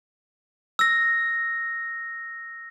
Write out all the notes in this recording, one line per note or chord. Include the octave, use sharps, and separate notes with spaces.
E6 A#6